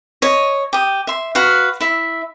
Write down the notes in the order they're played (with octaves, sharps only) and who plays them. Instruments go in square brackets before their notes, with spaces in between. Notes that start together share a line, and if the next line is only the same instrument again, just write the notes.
[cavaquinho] C#5 D#5
G4 D#6
E5 C6
F#4 B4 F5
E4 E5